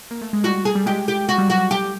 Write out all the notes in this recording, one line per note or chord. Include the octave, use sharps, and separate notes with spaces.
A#3
A3
G#3
G3 F#4
G#4
G3
G#3 G4
G4
G#3 F#4
G3
F#3 F#4
G3
G4